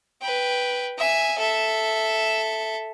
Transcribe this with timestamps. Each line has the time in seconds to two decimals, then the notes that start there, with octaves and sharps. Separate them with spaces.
0.22 B4 G5
0.98 E5 G#5
1.38 A4 E5